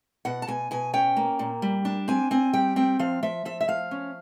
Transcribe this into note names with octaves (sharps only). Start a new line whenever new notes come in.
B2 F#5
A5
B2 G#5
B2 G#5
C#4 G5
A#3
A#2
G3
D4
C4 G#5
C4 G#5
G3 G5
C4 G5
F3 F5
F3 E5
F3 E5
E5
F3 F5
C#4